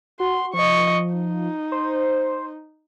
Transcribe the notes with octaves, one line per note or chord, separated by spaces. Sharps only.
F#4 C6
F3 D#5 C#6
D#4
C5